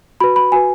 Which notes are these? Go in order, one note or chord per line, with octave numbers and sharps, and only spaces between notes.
F#4 B4 B5
B5
F#4 B4 G#5